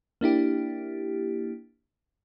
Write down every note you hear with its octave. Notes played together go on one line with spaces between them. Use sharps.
A#3 D4 E4 G4